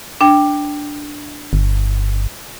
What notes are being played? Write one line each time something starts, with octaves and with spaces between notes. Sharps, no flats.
D4 G5
G1